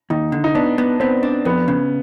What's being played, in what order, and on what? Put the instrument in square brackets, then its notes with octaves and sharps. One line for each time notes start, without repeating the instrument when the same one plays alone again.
[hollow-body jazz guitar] D#2 [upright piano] D#4
[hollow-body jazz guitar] D3
[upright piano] D#4
[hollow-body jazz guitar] B3 [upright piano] D4
[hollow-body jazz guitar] B3
[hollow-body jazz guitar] B3 [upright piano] C4
[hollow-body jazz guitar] D4
[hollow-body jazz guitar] F2 [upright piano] B3
[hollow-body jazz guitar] C#3